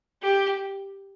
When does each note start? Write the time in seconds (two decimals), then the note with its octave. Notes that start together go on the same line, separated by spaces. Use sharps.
0.23 G4